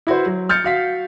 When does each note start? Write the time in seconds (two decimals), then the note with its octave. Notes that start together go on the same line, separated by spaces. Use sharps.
0.07 E4 F#4 B4 C5
0.26 F#3
0.49 F6 G6 A6 C#7
0.64 F#4 F5 B6